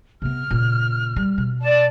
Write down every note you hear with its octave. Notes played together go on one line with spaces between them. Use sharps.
C3 B3 F6
A#2 C#3
G3
B2
D5 A5